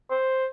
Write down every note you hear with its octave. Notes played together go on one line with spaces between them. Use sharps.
C5